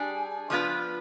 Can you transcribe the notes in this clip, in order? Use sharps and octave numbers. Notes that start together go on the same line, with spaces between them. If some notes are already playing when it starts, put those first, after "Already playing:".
Already playing: G3 D4 G#4
F3 B3 D4 F4 B4